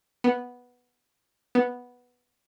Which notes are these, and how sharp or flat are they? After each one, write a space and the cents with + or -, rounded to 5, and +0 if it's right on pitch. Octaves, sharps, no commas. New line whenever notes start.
B3 -5
B3 -5